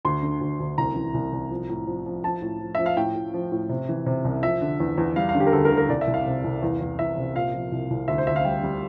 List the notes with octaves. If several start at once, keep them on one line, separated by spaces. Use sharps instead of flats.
D2 C6
D3
D2
D2
C2 A#5
E3
C2
C2
F3
A2
F3
F3
F3 A5
A2
F3
F3 E5
F5
A2 G5
A2
F3
A2
C3
E3
C3
C2
F3 E5
D3
E2
E2
G3 F5
F5
D3
G4
A#4
D2 A4
A#4
D3
A#4
C2 D5
E5
C2
F5
C3
C2
E2
E2
E2 E5
C3
A#2 F5
F3
C2
C2
D2 E5
C5
D2 E5
F5
G3 G5
G3